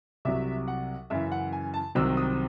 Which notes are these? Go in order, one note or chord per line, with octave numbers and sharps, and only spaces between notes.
C2 C3 F#3 E5
F#5
F#2 C#3 E3 E5
F#5
G#5
A5
C2 C3 D#3 F#3 C4 E6
D#6